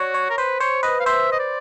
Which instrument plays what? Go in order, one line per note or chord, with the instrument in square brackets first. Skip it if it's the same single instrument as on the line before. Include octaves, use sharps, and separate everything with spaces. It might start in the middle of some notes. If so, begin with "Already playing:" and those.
Already playing: [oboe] F#4 [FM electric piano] C#5 D5
[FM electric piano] C#5
[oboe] A#4
[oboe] B4 [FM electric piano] C5
[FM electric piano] C5 [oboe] C#5
[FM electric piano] B4 [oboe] D#5
[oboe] F5
[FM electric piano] C5 [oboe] E5
[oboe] D#5
D5